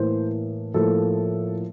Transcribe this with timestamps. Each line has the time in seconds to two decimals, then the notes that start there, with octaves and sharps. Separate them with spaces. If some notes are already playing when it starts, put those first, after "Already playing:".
Already playing: A2 E3 A#3 C5
0.74 A2 F3 A#3 A4